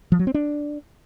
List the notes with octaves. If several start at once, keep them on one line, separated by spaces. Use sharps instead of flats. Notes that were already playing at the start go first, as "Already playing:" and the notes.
F3
F#3
C4
D4